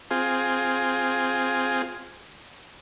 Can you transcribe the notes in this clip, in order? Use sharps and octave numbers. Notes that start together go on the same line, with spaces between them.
C4 F4 G#4